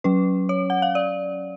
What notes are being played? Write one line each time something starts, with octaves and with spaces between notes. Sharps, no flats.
F#3 C#4 B4
C#5
F#5
F5
D5